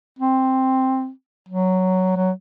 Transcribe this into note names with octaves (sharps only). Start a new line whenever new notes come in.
C4
F#3
F#3